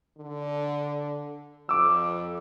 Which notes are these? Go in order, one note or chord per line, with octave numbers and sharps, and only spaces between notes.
D3
F2 D6 E6